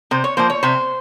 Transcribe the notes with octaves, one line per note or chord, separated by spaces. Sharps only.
C3 C5
C#5
F3 A#3 C5
C#5
C3 C5